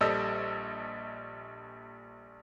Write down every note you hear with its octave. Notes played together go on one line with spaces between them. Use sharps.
A#1 G3 A4 D#5 E6